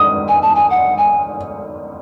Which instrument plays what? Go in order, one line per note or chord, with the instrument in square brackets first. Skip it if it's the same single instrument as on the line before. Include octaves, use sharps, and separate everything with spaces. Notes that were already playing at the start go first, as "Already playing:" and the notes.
Already playing: [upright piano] D#6
[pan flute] G#5
A5
G#5
F#5
G#5